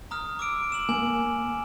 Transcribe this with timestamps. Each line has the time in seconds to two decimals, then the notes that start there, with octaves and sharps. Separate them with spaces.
0.11 A#5 D#6 F6
0.39 D6 E6 D7
0.72 E7 F#7
0.89 A#3 G#5 F#7